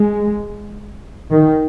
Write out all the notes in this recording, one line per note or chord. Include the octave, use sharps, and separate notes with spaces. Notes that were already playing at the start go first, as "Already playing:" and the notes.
Already playing: G#3
D#3